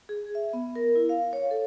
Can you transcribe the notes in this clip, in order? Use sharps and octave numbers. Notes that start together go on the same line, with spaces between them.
G#4
E5
B3
A#4
E4
F5
C#5
A4